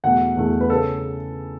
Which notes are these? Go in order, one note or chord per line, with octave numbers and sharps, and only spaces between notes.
E2 B2 A3 F#5
E2 B2 A3
B4
C#3 A4